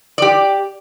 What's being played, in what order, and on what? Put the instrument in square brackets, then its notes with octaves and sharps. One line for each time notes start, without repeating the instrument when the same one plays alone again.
[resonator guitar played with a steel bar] G4 D5